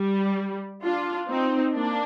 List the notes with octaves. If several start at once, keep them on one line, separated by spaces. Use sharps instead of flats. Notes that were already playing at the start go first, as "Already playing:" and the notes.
Already playing: G3
D4 F4
C4 D#4
A#3 D4